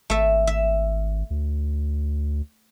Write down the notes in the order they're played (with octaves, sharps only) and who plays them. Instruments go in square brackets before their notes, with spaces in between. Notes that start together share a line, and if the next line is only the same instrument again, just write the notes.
[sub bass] G#1 [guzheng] A3 E5
[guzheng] E5
[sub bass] D2